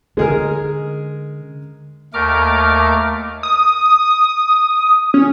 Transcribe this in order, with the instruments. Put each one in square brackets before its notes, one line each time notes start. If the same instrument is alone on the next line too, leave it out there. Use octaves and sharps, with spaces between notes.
[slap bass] D3 C#4 [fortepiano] G#3 G#4 A#4
[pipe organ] D#2 A3 A#4 D6 F6
[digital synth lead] D#6
C#4